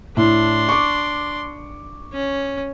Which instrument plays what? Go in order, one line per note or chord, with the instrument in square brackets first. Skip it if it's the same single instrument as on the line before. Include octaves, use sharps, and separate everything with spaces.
[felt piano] A2 [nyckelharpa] D4 C6
[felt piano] C#6 D6
[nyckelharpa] C#4